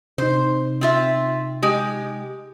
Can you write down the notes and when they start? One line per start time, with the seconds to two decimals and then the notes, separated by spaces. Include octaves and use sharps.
0.18 C3 D#4 C5
0.81 C4 F4 E5
1.63 G#3 G4